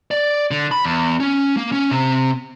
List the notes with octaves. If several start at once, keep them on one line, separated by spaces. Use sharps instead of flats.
D5
D3
B5
E2
C#4
A#3
C#4
C3